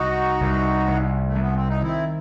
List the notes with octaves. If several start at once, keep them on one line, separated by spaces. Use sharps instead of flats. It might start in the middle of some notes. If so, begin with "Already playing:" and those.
Already playing: C2 D#4 F#4
C2
C2
A3
C2
B3
C4
D#4
D#3 C4 E4